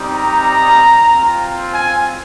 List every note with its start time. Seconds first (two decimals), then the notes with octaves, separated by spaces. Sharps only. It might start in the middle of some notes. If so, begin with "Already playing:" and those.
Already playing: G3 C4 D#4
0.17 A#5
1.10 C4 F4
1.72 G#5